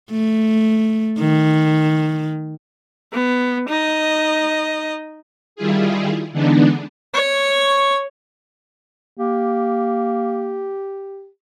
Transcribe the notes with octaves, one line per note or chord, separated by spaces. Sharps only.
A3
D#3
B3
D#4 D#5
D#3 G3 E4 F4 G#4
D3 E3 G#3 B3 D4 D#4
C#5 C#6
A#3 G4